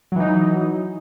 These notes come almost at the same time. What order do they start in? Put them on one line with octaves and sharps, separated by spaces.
F#3 E3 D#4